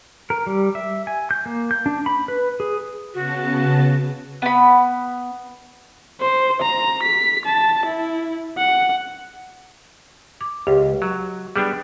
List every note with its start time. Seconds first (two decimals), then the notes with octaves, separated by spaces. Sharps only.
0.30 A#4
0.47 G3
0.75 E5
1.07 G#5
1.31 G6
1.46 A#3
1.71 G6
1.86 D4
2.06 B5
2.28 B4
2.60 G#4
3.14 C#3 B3 F#4 A5
4.42 B3 B5
6.21 C5
6.62 A#5
7.03 B6
7.45 A5
7.86 E4
8.58 F#5
10.41 D6
10.67 C#2 G4
11.02 F#3
11.56 G3 B3 D4 G#4 G5